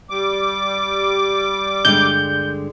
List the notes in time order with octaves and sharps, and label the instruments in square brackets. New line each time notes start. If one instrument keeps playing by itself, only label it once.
[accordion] G3 D6
[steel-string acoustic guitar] G2 D3 G#3 [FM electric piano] G6